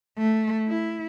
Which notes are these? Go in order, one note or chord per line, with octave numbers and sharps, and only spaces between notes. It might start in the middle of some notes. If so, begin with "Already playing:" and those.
A3
E4